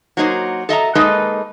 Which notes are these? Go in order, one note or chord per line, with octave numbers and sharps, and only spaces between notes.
F#3 A#3 D#4 C5
A4 D#5 E5 A#5
G#3 A#3 D#4 A4 B4 D#5